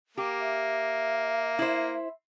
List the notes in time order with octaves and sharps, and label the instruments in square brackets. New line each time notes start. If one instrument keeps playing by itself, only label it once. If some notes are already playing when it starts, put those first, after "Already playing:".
[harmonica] A#3 [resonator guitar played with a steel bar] G4
[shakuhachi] E5
[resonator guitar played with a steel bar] E4 C5